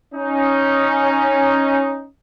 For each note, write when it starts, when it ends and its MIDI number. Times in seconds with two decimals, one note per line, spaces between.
0.15 2.07 61
0.15 2.07 63